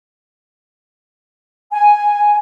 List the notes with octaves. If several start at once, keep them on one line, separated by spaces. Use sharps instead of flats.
G#5